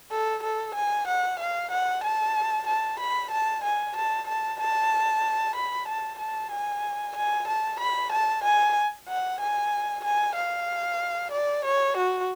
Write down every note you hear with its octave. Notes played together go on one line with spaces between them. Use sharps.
A4
A4
G#5
F#5
F5
F#5
A5
A5
B5
A5
G#5
A5
A5
A5
B5
A5
A5
G#5
G#5
A5
B5
A5
G#5
F#5
G#5
G#5
F5
D5
C#5
F#4